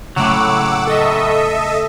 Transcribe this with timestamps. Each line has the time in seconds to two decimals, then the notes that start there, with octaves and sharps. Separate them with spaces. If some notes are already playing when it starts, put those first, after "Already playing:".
0.16 A2 C#3 F#3 A3 F#5 D6 E6
0.87 A4 D#5 E5